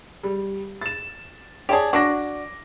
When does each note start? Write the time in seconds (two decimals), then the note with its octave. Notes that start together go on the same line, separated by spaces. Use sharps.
0.23 G3
0.81 A6 E7
1.69 G4 G#4 C#5 D5 A5
1.93 D4 F#4 D6 A#6